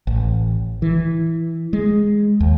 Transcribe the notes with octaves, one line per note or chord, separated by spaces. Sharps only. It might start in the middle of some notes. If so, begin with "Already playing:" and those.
A1
E3
G#3
D#2